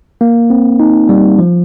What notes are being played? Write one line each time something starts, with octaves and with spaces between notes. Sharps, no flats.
A#3
C4
D#4
G3
F3